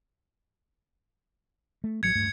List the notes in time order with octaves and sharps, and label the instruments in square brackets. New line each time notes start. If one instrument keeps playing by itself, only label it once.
[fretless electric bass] A3
[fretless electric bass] A1 F#3 [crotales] G#6 C#7
[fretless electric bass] D1 G2 A3